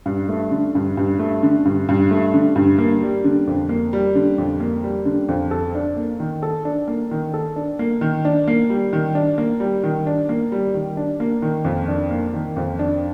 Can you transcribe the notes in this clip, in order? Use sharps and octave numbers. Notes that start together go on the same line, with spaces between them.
G2
A3
D3
G2
G2
A3
D3
G2
G2
A3
D3
G2
A#3
G3
D3
F2
A#3
G3
D3
F2
A#3
G3
D3
F2
A4
D4
A#3
D#3
A4
D4
A#3
D#3
A4
D4
A#3
D#3
D4
A#3
G3
D#3
D4
A#3
G3
D#3
D4
A#3
G3
D#3
D4
A#3
D#3
F2
D4
A#3
D#3
F2
D4